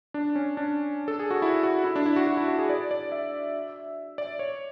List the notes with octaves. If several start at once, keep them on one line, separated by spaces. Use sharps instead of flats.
D4
C#4
D4
A4
G#4
F#4
E4
F#4
E4
D4
E4
F#4
F#4
E4
F#4
G#4
D5
D5
E5
D5
C#5